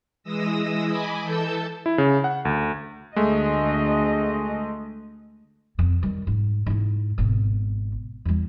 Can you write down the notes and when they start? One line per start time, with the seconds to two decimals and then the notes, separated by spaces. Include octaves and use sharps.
0.23 E3 G#3 D#6 E6 A#6
0.86 D#5 G#5 B5 D6
1.22 E3 A4 A5 E6 G6
1.86 E4
1.98 C#3
2.24 F#5
2.45 D2
3.16 D2 G#3 A3 D#5
5.78 F2 C4
6.03 D#3 G3
6.27 G#2
6.66 G#2 E4
7.18 G#1 B2
8.25 E2 G3